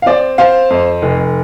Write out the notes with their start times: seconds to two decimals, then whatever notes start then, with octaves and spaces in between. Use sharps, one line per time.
0.02 F5
0.06 C4 D5
0.38 C4 C5 F5
0.70 F2
1.02 F1